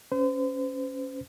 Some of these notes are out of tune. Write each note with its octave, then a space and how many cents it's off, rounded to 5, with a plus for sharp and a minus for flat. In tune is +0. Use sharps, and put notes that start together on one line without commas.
C#4 +0 C5 -40